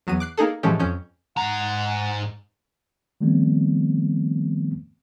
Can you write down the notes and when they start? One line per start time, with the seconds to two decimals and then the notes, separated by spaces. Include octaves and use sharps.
0.07 E2 F#3 B3 D#7
0.20 D6 F#6 C7
0.38 A#3 D#4 G#4 A4
0.63 A2 E3 F3 G#3 C#4 G4
0.80 F2 C#4 G6
1.37 G#2 F#5 A#5
3.21 D#3 F3 G3 A3 B3 C4